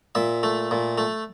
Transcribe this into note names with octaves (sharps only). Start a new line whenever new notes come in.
A#2 E5
A3
A#2
A3